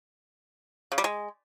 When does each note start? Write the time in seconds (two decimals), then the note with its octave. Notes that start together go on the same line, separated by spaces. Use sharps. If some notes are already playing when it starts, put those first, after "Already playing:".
0.92 C#3
0.98 G3
1.04 G#3